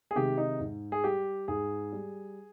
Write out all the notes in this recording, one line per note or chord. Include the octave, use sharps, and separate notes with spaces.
G#4
C3 D#3 G#3 G4
D#4
G#2
G#4
G3 G4
G#2 G#4
G3